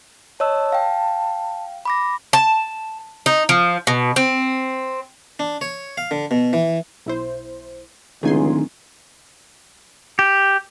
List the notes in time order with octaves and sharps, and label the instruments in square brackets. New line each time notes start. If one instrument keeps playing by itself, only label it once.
[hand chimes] C#5 D#5 E6 [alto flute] A5
[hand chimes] F5 G5
B5 D6 A#6
[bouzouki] A5
D#4
F3
B2
C4
[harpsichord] D4
C#5
F5
D3
B2
E3
[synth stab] B1 E4 C5
[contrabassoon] D1 [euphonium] C#2 [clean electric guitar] D#3 [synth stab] G#4 G#5 C6
[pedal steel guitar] G4